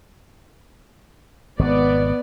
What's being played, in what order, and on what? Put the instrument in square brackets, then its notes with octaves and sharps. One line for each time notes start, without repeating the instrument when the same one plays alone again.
[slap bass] G#1 B2 [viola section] B3 D5